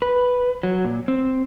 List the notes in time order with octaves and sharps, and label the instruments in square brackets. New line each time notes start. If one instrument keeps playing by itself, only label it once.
[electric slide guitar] B4
F#3
A#2
C4